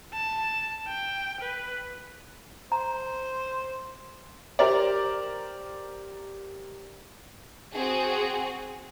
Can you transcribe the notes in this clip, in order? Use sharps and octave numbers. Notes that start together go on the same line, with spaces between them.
A5
G5
B4
C5 A#5
G4 A#4 C5 D5
C4 F#4 G#4